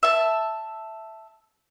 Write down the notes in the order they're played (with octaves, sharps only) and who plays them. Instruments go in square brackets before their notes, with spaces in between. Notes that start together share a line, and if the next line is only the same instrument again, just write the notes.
[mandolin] E5 A5